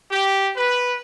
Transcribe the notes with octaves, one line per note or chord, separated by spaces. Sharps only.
G4
B4